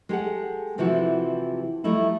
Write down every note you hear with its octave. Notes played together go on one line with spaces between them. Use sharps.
G#3 G4 A4 F#5
C3 E3 F3 E4 F#4 G4
F3 G3 A3 D#4 E4